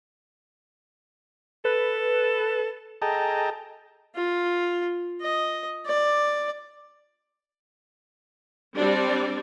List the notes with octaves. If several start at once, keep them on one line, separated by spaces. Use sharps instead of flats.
A4 B4
G#4 A4 D#5 G5 A5 A#5
F4
D#5
D5
G3 C4 D4 D5